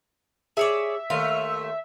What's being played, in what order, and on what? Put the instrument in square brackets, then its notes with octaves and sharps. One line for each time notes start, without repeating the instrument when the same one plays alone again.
[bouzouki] G#4 C#5 D5 [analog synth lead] E5
[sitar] D#2 A3 [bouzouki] F5